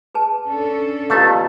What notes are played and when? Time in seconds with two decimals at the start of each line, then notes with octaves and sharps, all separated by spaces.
0.15 G#4 B4 A5
0.46 C#4 D4 A4
1.10 B2 F3 A3 G4 F5 A#5 D#6